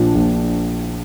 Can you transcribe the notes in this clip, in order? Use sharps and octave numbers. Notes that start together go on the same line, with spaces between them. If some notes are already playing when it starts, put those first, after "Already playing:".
Already playing: A#1 A#2 F3 D4
A#1